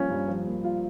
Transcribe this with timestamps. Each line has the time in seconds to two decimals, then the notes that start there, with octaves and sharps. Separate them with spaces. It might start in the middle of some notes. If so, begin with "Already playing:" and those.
Already playing: G2 F3 A#3 C#4 F4
0.10 G2
0.28 F3
0.47 A#3
0.64 F4